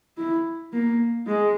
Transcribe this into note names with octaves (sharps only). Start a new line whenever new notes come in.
E4
A#3
G#3